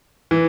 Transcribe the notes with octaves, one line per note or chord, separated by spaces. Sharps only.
E3